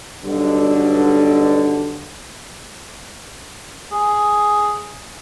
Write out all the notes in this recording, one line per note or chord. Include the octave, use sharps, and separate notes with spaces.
B1 G2 B2 D3
G#4